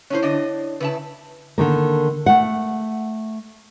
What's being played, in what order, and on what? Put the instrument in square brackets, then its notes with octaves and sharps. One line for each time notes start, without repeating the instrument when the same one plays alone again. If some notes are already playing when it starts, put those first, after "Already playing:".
[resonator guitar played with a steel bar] C#4 D4 C5 [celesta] E4 C#5
[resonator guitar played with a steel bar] D3 D4 D#5
[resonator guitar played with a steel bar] C#3 E4 A5 [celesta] B4
[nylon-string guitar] D3 D#3 A#3
A3 F#5